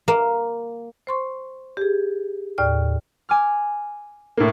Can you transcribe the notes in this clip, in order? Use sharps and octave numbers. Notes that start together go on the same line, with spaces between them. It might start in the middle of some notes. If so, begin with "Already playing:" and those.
A#3
C5 C6 C#6
G4 G#4
D#2 A2 D5 F6
G#5 D6 F6
A2 A#3